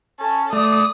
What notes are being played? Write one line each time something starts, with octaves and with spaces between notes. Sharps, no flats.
C#4 A4
A3 D5 D#6